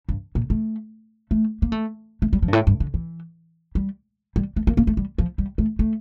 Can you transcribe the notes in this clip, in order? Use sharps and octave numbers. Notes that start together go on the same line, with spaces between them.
G2
A#2
A3
A3
A#3
A3
A3
G3
F3
G2
A2
G2
D3
E3
G3
G3
A3
A#3
A#3
A3
G3
F3
G3
A3
A3